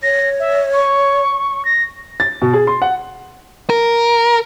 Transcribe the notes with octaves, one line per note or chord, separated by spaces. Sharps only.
C#5 A#6
E5
C#6
A#6
A6
B2
G#4
C6
F#5
A#4